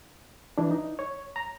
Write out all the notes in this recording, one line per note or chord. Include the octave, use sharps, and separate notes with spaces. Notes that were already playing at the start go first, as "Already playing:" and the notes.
E3 D4
D#4
C#5
A#5